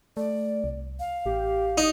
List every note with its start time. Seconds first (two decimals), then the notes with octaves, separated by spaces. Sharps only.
0.17 A3 D5
0.64 C2
1.00 F5
1.26 A1 G4
1.78 D#4 D#6